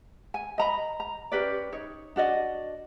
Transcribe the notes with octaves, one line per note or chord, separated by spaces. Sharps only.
G#5
D#5 A#5 B5
A#5
C#4 G4 B4 D5
D#4 C#5
D4 F#4 D5 D#5